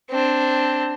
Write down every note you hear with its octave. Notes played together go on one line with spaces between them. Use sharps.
C4 D4